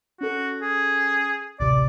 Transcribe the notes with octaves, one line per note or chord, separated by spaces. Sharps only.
C#4 F#4 A4
G#4
A1 D2 C3 D5